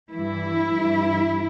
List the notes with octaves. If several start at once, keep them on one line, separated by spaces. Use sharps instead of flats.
G2 E3 E4
G2 E3